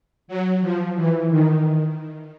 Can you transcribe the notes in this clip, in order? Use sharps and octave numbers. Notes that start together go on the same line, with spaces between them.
F#3
F3
E3
D#3